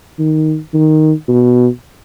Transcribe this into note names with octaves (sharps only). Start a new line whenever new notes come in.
D#3
D#3
B2